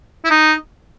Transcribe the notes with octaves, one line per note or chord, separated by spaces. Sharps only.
E4
D#4